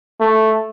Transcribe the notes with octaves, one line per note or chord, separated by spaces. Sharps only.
A3